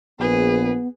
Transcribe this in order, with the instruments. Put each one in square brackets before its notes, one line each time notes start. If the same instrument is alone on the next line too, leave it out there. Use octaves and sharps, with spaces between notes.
[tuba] A#1 [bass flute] B3 [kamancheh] G#4 B4